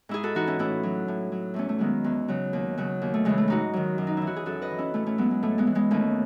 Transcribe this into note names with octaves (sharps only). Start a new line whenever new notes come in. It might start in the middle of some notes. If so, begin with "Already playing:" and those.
G#2 E4 G#4
F#4 A4
E3 D#4 F#4
C#4 E4
A2 C#4 E4
F#3
A2
F#3
E2 A3 C#4
A3
D#3 F#3 G#3 B3
E2
C#3 F#3
D#2
C#3 F#3
D#2
A3
C#3 E3 G#3
A3
G#2 D#4 F#4
D#3 F#3
F#2
D#4
E3 E4
F#4
G#4
F#2 F#4 A4
B4 D#5
E3
C#4 E4
A2 A3 C#4
A3 C#4
F#3 G#3 B3
G#3
A2 A3
G#3 B3
E3
G#3 B3
D#2 A3 C#4